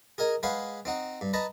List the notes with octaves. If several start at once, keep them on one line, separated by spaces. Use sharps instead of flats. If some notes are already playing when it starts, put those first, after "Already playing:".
G#4 A#4 D#5 G#5
G#3 G#4 B4 C#5 F5 F#5
C4 D#4 F#5
G2
B4 D#5 A5 A#5